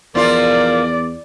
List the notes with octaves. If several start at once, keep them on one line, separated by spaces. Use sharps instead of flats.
E2 F3 F4 A#4 D5